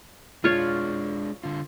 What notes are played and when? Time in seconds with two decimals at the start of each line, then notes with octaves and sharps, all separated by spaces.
0.44 G#3 D4 F4 C#5
1.44 D3 F4